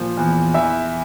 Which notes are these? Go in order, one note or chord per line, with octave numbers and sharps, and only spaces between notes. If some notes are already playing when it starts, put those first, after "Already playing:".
Already playing: A#2 F3
E2
E3 E5